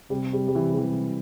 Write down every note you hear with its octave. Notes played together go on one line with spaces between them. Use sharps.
C3 G3
G3
G3
E3
G3
E3